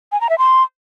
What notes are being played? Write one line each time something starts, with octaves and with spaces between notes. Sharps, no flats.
G#5
A#5
E5
C6